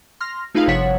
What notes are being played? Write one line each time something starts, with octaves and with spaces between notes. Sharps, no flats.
C6 F6 A#6
A3 D#4 F4 G#4 B4 F5
G1 C3 F3 C#5 F#5 B6